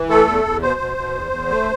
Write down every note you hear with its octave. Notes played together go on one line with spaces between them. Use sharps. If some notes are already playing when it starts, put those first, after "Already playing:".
Already playing: E3
A3 A4
E2
E2
B2 C5
B2
B2
E2
E2
A3